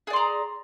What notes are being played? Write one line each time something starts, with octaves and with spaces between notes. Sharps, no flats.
G#4 D5 A#5 C6